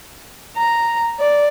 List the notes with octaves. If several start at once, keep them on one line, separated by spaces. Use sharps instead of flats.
A#5
D5